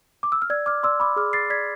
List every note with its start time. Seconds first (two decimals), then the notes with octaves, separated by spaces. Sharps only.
0.23 D6
0.32 E6
0.42 F6
0.50 D5 E6 G#6
0.66 D6 F6
0.83 D5 C6 E6
1.00 B5 D6
1.16 G#4 D6 F6
1.33 A6 C7
1.50 D5 G#6 B6